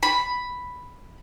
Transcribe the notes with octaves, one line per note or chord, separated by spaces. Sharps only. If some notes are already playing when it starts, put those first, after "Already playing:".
B5